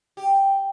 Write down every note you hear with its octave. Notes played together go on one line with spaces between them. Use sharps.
G4